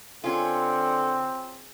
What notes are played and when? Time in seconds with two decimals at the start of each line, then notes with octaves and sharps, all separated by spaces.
0.24 D3 C4 C#4 F4 G#4